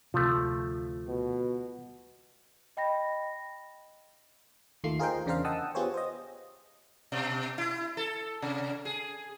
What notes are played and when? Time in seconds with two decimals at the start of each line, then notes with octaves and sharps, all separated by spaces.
0.14 D2 C3 F3 A3 F4
1.08 B2
2.77 D#5 G5 B5 A#6
4.84 D#2 D#3 A3 F4 C7
4.99 F4 G#4 A#4 C5 D#5 G5
5.26 E2 C#3 D4 A#4 C5 F5
5.45 D#5 F#5 G5 A5 D#6 E6
5.75 B3 F4 G4 G#4 C5 C#5
5.94 C5 D#5
7.12 B2
7.58 E4
7.97 A4
8.42 C3
8.85 G#4